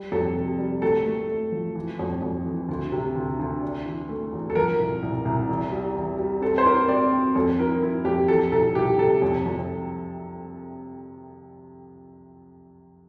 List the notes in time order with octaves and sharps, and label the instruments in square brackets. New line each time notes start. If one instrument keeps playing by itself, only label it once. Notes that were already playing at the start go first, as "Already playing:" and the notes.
Already playing: [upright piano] G3
F2 A4
C3
G3
A3 A4
A3
A3
F3
E3
F2
F2
E3
D2
C3
D2
D2
D4
E3
A3
E2
A4
F3 A#4
C2
C2
C2
E2
G3
E2
G3
C4 A4
C5
E4 A#4
C4 D5
C4
F2 A4
E4 A#4
E4
F2 G4
E3 A4
C2 A4
C2 G4
C3 A4
F2
F2